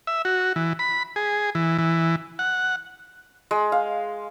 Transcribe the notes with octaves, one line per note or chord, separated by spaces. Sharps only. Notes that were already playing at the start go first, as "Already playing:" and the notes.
E5
F#4
E3
B5
G#4
E3
E3
F#5
G#3
F5